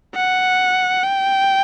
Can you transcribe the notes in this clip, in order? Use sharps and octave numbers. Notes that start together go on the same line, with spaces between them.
F#5
G5